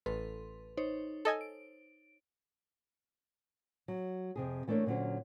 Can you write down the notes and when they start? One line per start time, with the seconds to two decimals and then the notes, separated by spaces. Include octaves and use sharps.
0.06 A1 A4 B4 C6
0.77 D#4 C5 C#5
1.25 A4 D#5 G#5
1.41 D7
3.88 F#3
4.36 F2 C3 G#4
4.68 E3 A3 A#3 D4 A#4 C#5
4.86 A#2 D3 F#3 C#4 C5